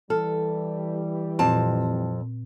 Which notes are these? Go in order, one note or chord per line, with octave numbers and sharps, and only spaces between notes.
E3 G3 A4 F6
F2 A#2 C4 A5